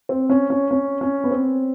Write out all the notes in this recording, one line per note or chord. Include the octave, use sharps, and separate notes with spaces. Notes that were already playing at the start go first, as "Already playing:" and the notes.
C4
C#4
C#4
C#4
C#4
B3
C4